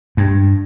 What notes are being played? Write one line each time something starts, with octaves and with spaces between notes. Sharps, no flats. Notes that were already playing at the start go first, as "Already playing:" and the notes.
G2